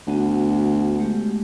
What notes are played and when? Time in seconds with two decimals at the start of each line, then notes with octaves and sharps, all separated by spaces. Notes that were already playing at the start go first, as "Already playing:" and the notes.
0.07 D2 B3 F#4 F#5
0.99 G#3 A3 G4